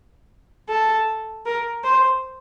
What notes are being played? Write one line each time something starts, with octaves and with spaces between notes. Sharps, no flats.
A4
A#4
C5